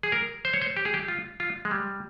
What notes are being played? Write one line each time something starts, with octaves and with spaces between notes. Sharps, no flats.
G#4
A#4
C5
C#5
C5
G4
G#4
G4
F4
F4
G#3
G3